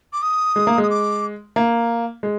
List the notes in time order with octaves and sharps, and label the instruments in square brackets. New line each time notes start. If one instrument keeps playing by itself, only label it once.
[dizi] D6
D#6
[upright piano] G#3
A#3
[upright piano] G#3 [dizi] D#6
[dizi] D6
[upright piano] A#3
G#3